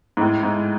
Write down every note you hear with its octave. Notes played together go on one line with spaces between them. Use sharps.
G#2
A2
G#2